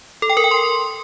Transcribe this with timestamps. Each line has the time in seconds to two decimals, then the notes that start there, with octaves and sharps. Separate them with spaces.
0.22 A4
0.30 G5
0.37 A#4
0.44 G5
0.51 C6